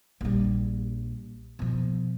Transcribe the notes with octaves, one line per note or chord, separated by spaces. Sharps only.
A#1 G3
B2 F3